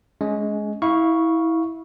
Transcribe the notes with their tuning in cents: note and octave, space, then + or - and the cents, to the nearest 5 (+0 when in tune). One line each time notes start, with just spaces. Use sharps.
G#3 +15 C#4 +20
E4 -20 F5 +5 C#6 +0